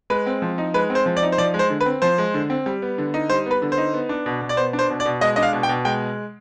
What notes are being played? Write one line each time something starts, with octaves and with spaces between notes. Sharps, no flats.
G#3 B4
C4
F3
D#4
G#3 B4
C4
C5
F3
D5
D#4
C5
F3 D5
G#3
C5
D3
B4
C4
F3 C5
G#3
D3
C4
G3
B3
D3
D#4
G3 C5
B3 B4
D3
C5
D#4
B3
D4
B2
B2
D5
B3 C5
D4
C5
B2
D5
B2
G#3 D#5
D4 D#5
F5
B2
G5
B2
G#3 G5